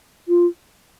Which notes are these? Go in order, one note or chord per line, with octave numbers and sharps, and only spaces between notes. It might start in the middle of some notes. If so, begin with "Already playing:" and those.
F4